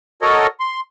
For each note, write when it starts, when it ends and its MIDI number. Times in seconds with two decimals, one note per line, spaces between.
0.22 0.47 66
0.22 0.47 69
0.22 0.47 70
0.22 0.47 73
0.22 0.47 75
0.60 0.80 84